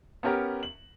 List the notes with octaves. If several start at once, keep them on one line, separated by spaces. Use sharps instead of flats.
B3 C#4 G4 A#4 A#5
F#7